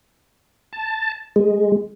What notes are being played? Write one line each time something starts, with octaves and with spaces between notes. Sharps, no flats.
A5
G#3